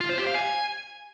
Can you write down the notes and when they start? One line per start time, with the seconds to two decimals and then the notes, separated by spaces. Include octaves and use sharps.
0.01 F4
0.09 C5
0.18 G4
0.27 F5
0.35 G#5